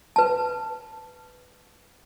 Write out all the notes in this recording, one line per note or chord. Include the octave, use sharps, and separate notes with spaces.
B4 A5